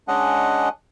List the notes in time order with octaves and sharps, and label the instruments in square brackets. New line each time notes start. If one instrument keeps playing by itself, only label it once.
[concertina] G#3 C#4 D4 D#5 F#5